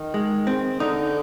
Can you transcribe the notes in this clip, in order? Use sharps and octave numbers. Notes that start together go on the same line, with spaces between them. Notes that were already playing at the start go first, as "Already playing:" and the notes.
Already playing: D#3
G#3
C4
D3 D#4